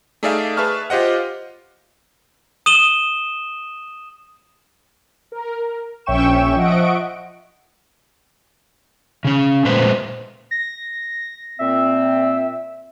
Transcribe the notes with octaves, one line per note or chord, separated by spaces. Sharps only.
A3 D#4 G#4 D5 E5 F5
G#4 B4 E5 A5 C#6 F6
F4 G4 C5 D#5 F#5
D#6 D#7 E7 F#7 G7
A#4
A#1 C#4 E5 G5 C#6 E7
F3 D#5 E5 F#5 C#6 D7
C#3 C#4
A#2 G#3 A3 B4 C5
A#6
A#2 C4 E5